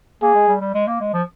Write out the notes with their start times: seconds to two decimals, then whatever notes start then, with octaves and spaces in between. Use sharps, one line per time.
0.22 A#3 G#4
0.35 G#3
0.48 G3
0.61 G3
0.75 G#3
0.87 A#3
1.00 G#3
1.14 F3